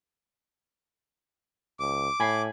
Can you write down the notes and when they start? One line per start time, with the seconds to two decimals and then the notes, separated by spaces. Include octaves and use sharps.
1.80 C#2 D6
2.20 A2 G#5 B5 C7